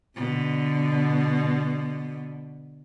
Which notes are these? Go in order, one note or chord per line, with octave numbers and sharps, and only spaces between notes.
B2 D3